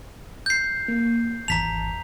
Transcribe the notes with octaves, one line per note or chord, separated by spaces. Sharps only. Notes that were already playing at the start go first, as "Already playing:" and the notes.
G6 C7
A#3
G#1 E2 A5 A#5 B6 F7